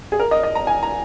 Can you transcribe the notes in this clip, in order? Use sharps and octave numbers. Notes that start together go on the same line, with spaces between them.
G#4
A#4
D#5
D#5
A#5
G#5
A#5